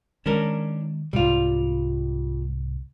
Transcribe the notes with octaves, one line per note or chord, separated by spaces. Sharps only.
D#3 G#3 C#4 D4 A#4
C2 G#2 C3 G3 F4